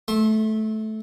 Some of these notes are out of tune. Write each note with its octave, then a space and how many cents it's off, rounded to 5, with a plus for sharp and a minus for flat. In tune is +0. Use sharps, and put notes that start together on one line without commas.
A3 -15 C6 +40